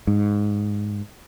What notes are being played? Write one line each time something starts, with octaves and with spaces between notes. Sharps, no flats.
G#2